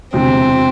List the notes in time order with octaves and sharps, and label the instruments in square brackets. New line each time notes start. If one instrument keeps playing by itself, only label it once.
[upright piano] E1 D2 C3 E3 [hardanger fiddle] C4